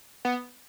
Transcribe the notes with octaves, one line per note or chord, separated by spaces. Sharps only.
B3